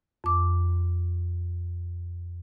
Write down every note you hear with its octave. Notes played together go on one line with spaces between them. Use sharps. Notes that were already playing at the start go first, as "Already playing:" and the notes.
F2 D6